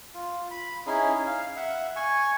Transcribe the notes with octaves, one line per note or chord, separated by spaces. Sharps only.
F4
B5
C#4 D#4 E4 G#4
F5
E5 F#5
G#5 C#6